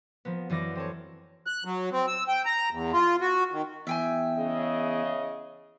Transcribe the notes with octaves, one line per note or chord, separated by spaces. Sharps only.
F3 A#3 B3
F#2 E3 D5 D6 A#6
C4 A4 C#5
F#6
F#3
C4
E6
G5
A#5
E2
F4
F#4
D#3
E2 E5 G5 G#5
C#3 D#5